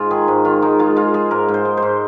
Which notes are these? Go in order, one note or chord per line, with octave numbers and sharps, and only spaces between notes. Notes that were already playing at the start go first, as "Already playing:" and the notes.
Already playing: G#2 G#3 F4
D#3 G#4
G#2
D#3 F4
G#3 D#4
G#3 F4
G#3 F4
G#3 G#4
G#2 A#4
G#2
C5
G#3
C5
G#2